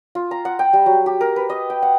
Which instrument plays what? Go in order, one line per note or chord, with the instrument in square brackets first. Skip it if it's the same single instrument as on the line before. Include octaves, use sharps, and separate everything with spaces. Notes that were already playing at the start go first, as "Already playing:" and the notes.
[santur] F4
A#5
F#5
G5
G3
F#3
G4
A#4
B4
D#5
G5
F#5